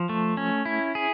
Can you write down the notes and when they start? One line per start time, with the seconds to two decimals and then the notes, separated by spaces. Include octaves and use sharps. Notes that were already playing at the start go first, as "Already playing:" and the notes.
Already playing: F3
0.09 A3
0.37 C#4
0.66 E4
0.95 G#4